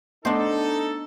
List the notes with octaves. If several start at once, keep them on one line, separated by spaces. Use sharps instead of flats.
A3 B3 D4 D#4 A4 C5 D#5